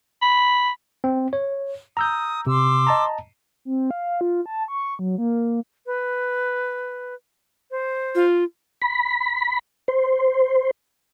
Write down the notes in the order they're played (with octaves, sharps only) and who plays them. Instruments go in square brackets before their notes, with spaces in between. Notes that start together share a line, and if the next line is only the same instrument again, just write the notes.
[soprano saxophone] B5
[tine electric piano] C4
C#5
[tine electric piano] A#5 E6 G6 [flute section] D#6
[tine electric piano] C3 [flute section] C6 D6 E6
[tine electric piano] D#5 A5 A#5
[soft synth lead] C4
F5
F4
A5
C#6
F#3
A#3
[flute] B4
C5
[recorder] F4
[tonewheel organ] B5
C5